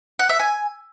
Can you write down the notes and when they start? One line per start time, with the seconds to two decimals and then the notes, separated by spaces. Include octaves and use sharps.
0.19 F#5
0.29 E5
0.39 G#5